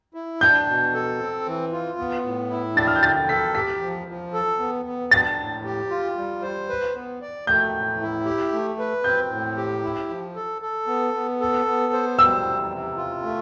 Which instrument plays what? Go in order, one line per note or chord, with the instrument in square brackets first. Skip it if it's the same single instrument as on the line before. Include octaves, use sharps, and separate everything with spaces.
[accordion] E4
[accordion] D4 [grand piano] G6
[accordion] B2
A4
C4
E3
F4
B3
A2
E4
[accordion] D4 [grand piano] A6
[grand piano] F6
G6
[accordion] D3 [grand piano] A6
[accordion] A4 [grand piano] B6
[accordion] G4 [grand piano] B6
[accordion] F3
F3
A4
B3
B3
[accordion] D4 [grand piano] A6
[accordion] A2
G4
F4
G3
C5
B4
B3
D5
[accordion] A3 [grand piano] G6
[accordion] A2
E4
G4
A3
B4
[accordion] C4 [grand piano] G6
[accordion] A2
G4
E4
F3
A4
A4
B3
B3
A4
B3
C5
[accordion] G3 [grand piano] E6
[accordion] C3
C3
F4
A3